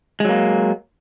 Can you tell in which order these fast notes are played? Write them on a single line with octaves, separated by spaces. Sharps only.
G#3 F#3 A#3